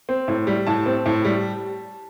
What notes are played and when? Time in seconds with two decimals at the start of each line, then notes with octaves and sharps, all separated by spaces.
0.09 C4
0.28 A2
0.47 G3
0.67 A2 A5
0.86 C4
1.06 A2
1.25 G3